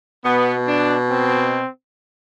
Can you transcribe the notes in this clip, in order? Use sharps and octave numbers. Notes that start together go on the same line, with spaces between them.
B2 B3
D4
C4